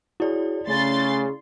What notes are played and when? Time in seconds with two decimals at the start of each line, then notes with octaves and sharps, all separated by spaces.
0.20 E4 F#4 G#4 C#5 D5
0.68 C#3 A3 C6 A6